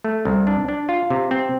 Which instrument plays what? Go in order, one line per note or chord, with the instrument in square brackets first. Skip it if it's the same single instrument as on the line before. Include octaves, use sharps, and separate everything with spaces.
[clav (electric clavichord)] A3
C2
D4
D4
F4
C3
C4